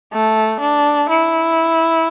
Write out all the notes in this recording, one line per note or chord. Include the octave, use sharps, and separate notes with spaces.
A3
D4
E4